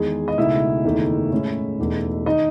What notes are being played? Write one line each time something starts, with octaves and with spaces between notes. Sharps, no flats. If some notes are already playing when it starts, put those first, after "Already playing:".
Already playing: E2 D#3 G#3 G#4 G#5
D#5
C#2 B2 A3 D#4 E4 E5
F#1 E2 D#3 A3
A2 G#3 C#4 E4
E1 E2 B2 A3 D#4
D#3 D#4 D#5